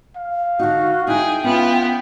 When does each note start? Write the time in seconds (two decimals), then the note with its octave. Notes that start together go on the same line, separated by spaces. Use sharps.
0.17 F5
0.59 D3 D#4 F#4
1.07 D#4 E4 G#4 G5
1.44 B3 C#4 F4